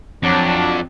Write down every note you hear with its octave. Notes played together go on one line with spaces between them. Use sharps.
F2 F#3 D4